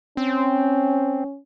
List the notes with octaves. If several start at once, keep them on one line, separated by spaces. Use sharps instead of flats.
C4 C#4